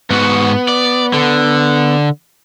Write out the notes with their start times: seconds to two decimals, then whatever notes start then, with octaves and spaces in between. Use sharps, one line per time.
0.11 G#2 B3 F#4
0.69 D5
1.14 D3